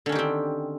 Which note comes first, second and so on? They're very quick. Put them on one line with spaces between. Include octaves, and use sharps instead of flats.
D3 C#4 D#3 G4 C4